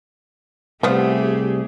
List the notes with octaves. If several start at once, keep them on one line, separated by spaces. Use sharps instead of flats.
C2 F3 A3 B3 G4 G#4 F#5